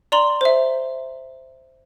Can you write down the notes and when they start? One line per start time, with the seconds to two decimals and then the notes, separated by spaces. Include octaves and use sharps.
0.12 D5 A#5 C6 F#7
0.41 C5 E5